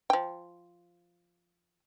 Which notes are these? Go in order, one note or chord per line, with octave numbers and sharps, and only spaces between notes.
F3 G5